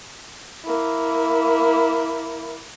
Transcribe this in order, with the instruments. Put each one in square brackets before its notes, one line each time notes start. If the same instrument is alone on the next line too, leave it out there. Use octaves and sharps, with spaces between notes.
[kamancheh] A#3 E4